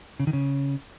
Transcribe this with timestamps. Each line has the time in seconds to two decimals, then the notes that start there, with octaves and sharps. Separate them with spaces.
0.20 C#3
0.27 D#3
0.33 C#3